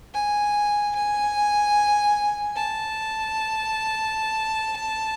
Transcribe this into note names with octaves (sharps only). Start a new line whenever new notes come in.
G#5
G#5
A5